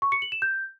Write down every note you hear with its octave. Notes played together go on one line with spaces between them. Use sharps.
C#6
C#7
F#7
E7
G6